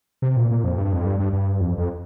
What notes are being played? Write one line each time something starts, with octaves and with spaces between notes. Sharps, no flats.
C3
A#2
A#2
F2
G2
F2
G2
G2
G2
F2
F2